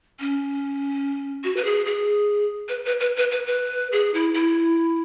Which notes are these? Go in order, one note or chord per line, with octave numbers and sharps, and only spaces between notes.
C#4
F#4
B4
G#4
G#4
B4
B4
B4
B4
B4
B4
G#4
E4
E4